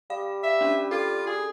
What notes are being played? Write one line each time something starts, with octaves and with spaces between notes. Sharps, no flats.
G3 F5
E5
C#4 D4
F4 A4
G#4